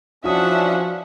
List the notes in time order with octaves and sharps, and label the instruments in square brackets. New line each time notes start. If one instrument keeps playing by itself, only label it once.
[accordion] E3 C#4 D4 [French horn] F3 [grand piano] F#4 D#6 [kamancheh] E5 F#5